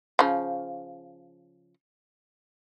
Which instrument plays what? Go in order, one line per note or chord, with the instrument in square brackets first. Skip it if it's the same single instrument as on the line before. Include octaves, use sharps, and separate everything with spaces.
[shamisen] C#3 F3